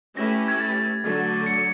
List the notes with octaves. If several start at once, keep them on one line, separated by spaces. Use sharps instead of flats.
A3 C#4 E4 G4 B4 A#6
G#6
A6
A6
D3 F#3 A3
C#7